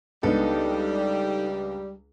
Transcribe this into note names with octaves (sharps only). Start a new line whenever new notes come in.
C#2 G3 B3 D4 D#4 A4